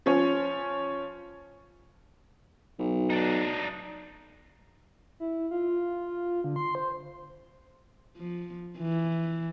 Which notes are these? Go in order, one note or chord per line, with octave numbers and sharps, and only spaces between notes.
F3 C#4 C#5
B1
D4 D#4
E4
F4
D3
C6
C5
F3
E3